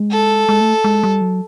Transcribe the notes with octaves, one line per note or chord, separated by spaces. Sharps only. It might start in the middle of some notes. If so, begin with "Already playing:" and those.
Already playing: G#3
A4
G#3
A3
G#3
G3
F#3